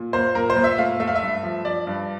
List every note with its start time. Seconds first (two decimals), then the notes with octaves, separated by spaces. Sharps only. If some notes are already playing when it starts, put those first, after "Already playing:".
Already playing: A#2
0.13 A#3 C5
0.35 A#2 A#4
0.50 C5
0.56 A#2
0.64 E5
0.78 A3 F5
1.00 A3 E5
1.08 F5
1.15 E5
1.22 G2
1.43 F3
1.65 F3 D5
1.87 G2